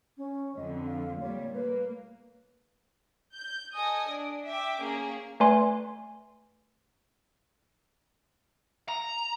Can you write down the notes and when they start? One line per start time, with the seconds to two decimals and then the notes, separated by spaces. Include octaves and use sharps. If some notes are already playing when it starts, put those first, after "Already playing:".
0.18 C#4
0.57 F2 D3 D#5
0.87 F5
1.21 A#2 G3 C#5
1.54 A#3 B4
3.34 G6
3.75 A4 D#5 G#5 D#6
4.09 D4
4.46 E5 G5 D6
4.79 A#3 C#4 G#4
5.40 A3 B4 D5 G#5 C6
8.88 A#5